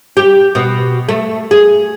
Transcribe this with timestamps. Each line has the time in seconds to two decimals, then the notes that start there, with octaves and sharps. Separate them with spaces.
0.17 G4
0.55 B2
1.09 A3
1.51 G#4